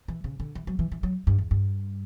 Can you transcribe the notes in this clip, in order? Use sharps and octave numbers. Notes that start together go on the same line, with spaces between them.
E3
C#3
D3
E3
F#3
E3
E3
F#3
G2
E2
G2